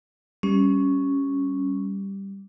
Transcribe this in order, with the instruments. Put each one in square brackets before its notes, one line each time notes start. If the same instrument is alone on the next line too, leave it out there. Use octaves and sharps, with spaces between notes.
[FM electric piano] G3 [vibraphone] C#4